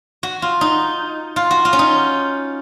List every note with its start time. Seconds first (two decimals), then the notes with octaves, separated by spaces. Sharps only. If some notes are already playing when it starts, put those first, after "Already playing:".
0.23 F#4
0.42 F4
0.61 D#4
1.36 F4
1.51 F#4
1.65 F4
1.73 C#4
1.79 D#4